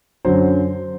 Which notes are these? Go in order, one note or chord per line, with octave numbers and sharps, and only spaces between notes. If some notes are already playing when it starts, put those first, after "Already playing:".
F#2 D3 F#3 C5